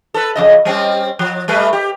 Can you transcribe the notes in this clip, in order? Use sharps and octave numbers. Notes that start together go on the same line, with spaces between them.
A4 B4
F2 C#3 D#5
G3 C4 C#4
F3
G3 A3 B4
G4